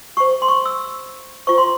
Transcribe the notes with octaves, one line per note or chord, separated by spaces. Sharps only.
G4 C5 C#6
C6
C#6
E6
F4 C5 C#6
C6